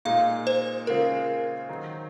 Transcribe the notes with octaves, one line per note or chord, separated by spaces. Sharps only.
A#2 G#3 D#4 F5
C5
C#3 G#3 C4 F4 A#4
D#3 F#3 C4 D#4